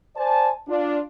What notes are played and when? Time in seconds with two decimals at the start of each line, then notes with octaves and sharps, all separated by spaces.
0.16 C5 D5 G#5 A5
0.68 D4 F4